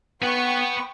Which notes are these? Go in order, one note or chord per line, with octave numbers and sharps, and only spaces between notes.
B3 B4 F#5 G5 C#6